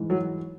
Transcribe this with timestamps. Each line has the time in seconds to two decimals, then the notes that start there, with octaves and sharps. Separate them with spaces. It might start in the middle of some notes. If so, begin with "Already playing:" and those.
Already playing: G#2 E3
0.10 F#3